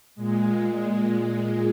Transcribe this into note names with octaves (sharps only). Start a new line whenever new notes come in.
A#2 G#3